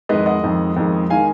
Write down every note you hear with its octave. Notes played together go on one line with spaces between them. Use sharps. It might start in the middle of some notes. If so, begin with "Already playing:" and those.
F2 D#3 G#3 B4 D#5
D#5 F#5
F2 D#3 G#3
F2 D#3 G#3
D#3 G#3 F5 G#5